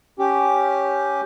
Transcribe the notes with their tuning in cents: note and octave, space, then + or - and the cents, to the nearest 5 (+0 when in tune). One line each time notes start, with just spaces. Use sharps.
C#4 +5 G4 +0